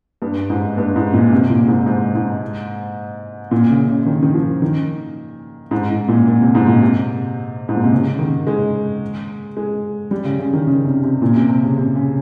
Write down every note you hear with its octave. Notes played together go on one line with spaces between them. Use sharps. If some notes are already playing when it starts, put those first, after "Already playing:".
G2
G#2
G2
G#2
A#2
C3
A#2
G#2
G#2
G#2
A#2
C#3
C#3
C#3
D#3
D#3
F3
D#3
G#2
G#2
A#2
A#2
C3
G#2
A#2
C3
G#2
A#2
C3
C#3
D#3
G#3
G#3
G3
C#3
C#3
D#3
C#3
C3
C3
A#2
C3
C3
C#3
C3
C#3